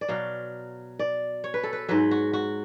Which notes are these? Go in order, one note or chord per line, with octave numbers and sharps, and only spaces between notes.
D5
B2 F#3 F5
D5
C#5
B4
A4
B4
G#2 F#3 B4
F#4
F#4